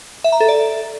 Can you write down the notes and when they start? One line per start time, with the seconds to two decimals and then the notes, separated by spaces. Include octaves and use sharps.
0.24 E5
0.32 A#5
0.40 A4
0.48 D5